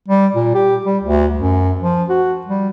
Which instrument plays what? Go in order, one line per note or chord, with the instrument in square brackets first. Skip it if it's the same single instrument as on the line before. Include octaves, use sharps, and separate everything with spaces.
[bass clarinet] G3
A#2
G4
G3
D2
F#2
F3
F#4
G3